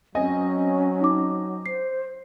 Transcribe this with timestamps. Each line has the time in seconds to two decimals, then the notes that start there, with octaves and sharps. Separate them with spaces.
0.15 F#3 C4 C#4 D#5 G#5
1.01 D#4 D6
1.66 C5 C7